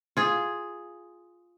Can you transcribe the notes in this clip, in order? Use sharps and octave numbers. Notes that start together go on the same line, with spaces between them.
F4 G#4